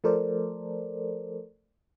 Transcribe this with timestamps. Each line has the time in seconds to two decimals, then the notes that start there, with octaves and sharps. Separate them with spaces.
0.04 F3 A3 A4 A#4 C5 D5